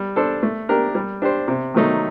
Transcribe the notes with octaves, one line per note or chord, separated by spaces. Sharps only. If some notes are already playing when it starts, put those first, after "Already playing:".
Already playing: G3
D4 A4 C5
A3
D4 G4 A#4
G3
D4 G4 C5
C3
D#3 F#3 A3 D#4